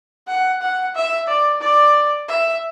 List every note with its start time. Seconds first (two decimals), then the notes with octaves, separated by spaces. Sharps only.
0.28 F#5
0.62 F#5
0.95 E5
1.28 D5
1.61 D5
2.29 E5